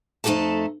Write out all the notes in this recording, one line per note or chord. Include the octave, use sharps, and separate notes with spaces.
F2 A3 D#4 G4 A4 A5